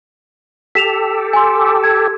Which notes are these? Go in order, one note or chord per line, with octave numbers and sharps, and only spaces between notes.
G4 A4 B6 E7 F7
G#5 C6
G#6